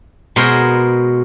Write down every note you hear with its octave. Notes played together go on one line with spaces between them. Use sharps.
B2 G#3 A#4 C5 G#5